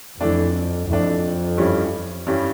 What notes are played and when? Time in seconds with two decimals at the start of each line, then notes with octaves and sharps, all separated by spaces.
0.20 F2 E3 A3 D4
0.88 F2 E3 A3 D4
1.57 G2 E3 G3 C#4
2.27 G2 E3 G3 C#4